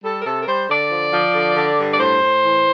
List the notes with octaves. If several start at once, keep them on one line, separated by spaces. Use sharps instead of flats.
G3 A4
A#4
C3 A4
A#4
G3 C5
D3 D5
F3
F3
D3
D3
G2
D5
A2 C5
A2
E3